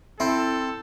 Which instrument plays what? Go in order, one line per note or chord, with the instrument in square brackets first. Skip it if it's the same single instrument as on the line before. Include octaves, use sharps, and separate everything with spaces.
[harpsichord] C4 [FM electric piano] E4 [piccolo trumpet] A4